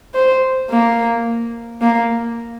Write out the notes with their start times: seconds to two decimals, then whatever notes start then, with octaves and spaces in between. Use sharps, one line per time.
0.15 C5
0.70 A#3
1.82 A#3